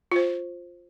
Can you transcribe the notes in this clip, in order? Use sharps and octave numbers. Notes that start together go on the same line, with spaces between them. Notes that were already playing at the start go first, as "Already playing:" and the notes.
F4 C5